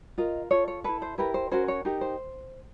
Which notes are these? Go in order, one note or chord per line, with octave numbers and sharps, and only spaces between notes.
F4 A#4 D#5
F4 A4 C#5
C#5
E4 A4 B4
C5
E4 G4 A#4 B4
C5
C#4 F#4 A#4 C5
C#5
D#4 G4 A#4
C5